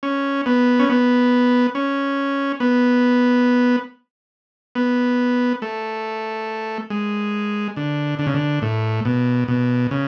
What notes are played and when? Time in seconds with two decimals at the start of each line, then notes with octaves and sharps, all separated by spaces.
0.03 C#4
0.46 B3
0.79 C#4
0.89 B3
1.75 C#4
2.60 B3
4.75 B3
5.62 A3
6.90 G#3
7.77 D3
8.19 D3
8.27 C#3
8.34 D3
8.62 A2
9.05 B2
9.48 B2
9.91 C#3